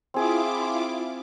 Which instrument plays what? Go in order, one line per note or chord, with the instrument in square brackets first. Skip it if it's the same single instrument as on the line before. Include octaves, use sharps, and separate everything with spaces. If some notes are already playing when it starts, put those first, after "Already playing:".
[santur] C4 G#4 D#6 [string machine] E4 F4 D6